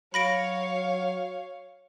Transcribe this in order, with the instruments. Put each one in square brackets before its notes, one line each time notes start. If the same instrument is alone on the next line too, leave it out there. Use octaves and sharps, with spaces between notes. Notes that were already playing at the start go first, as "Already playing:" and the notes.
[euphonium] F#3 [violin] C#5 F5 [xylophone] B5 A#6 D7